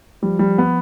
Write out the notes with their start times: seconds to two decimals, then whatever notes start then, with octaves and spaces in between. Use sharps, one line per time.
0.22 F3 G3
0.39 G3
0.58 B3